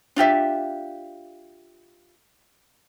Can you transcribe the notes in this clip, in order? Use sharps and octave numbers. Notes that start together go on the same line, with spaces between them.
D4 F4 G4 E5